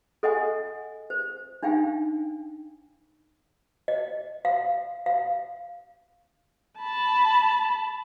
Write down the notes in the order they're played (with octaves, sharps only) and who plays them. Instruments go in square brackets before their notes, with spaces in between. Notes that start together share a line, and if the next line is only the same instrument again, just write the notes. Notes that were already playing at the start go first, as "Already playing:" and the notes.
[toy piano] A4 D#5 F#5 G#5
C5
D4 D#4 F5 G5 G#5
D#5
F5
F5
[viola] A5 B5